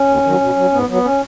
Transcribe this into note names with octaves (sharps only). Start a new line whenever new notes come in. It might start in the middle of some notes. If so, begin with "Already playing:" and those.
Already playing: C#4
D#2
D#3 F#3
B2
F#3
G#2 B3
F#3 B3
C#4